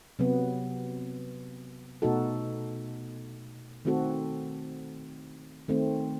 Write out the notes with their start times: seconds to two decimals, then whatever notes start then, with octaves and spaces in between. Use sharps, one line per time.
0.19 C3 F#3 B3
2.02 B2 A3 D#4 F#4 A4
3.85 D#3 A3 C4 F#4 A4
5.68 D#3 A3 C4